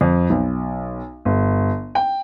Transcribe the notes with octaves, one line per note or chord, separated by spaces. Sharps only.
F2
B1
G1
G5